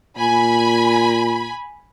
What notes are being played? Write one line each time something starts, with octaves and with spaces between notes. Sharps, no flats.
A#2 G#5 B5